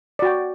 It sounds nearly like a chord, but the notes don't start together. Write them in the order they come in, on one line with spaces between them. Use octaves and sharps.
D5 F#4 G5